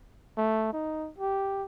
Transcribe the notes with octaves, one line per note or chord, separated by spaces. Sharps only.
A3
D#4
G4